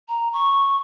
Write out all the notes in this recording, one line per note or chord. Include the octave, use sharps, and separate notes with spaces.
A#5
C#6